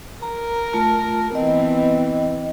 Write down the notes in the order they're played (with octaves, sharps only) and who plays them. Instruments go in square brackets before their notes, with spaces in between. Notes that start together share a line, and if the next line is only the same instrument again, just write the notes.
[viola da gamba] A#4 [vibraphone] A#5
[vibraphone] A3 F4 A5
[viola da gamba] E3 B3 C4 [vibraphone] D#5